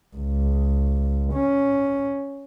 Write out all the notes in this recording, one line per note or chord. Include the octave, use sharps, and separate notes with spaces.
C#2
C#4